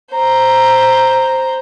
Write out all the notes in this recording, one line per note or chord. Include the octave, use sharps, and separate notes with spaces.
C5 A#5